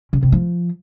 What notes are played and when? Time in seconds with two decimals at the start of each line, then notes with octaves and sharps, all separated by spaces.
0.13 C#3
0.23 C3
0.32 F3